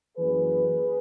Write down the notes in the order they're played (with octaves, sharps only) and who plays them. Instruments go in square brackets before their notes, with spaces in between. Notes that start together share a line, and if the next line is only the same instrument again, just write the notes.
[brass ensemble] F#2 E3 A#3 G#4 B4